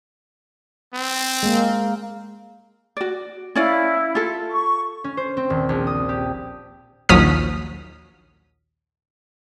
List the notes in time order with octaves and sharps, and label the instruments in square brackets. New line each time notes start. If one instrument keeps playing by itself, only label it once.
[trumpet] C4
[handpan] G#3 A#3
[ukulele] F#4 D5
[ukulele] C#4 D5 F5 [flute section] E4
[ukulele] F4 A4
[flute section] C#6
[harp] C#4
C5
C4
D#1
A#1
D#6
G4
[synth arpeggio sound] A#1 D#2 F#3 D#6 F6 B6